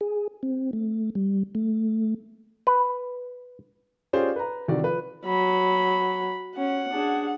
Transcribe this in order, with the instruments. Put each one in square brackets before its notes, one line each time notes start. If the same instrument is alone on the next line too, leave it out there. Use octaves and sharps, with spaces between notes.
[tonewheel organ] G#4
C4
A3
G3
A3
[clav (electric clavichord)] B4
[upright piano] C#4 F4 G4 G#4 C5 D5
B4 A#5
C3 D#3 E3 F#4 D5
F3 B4
[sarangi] F#3 [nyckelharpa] B5
[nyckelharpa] C#4 [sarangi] F#5
[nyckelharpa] D4 G#4